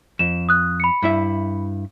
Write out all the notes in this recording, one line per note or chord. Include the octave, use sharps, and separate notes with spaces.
F2 E7
D#6 F#6
B5 C#7
G2 E4 E5